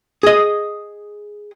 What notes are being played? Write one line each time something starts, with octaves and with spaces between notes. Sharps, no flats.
G#4 D#5